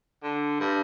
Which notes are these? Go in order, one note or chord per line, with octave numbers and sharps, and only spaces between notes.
D3
G2